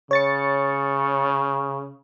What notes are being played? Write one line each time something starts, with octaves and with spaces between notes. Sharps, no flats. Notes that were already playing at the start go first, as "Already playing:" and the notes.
C#3 C#5 A6 C#7